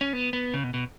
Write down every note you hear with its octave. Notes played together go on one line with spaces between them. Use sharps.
C#4
B3
B3
C#3
B2
B2